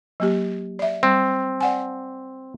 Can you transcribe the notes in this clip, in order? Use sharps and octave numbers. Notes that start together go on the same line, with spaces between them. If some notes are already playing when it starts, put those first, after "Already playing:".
F#3 A#3 G4
D5 E5
G3 C4
D5 F#5 G#5